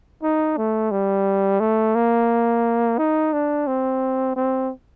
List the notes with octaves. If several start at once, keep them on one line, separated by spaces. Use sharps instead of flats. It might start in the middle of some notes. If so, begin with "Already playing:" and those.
D#4
A3
G3
A3
A#3
D#4
D4
C4
C4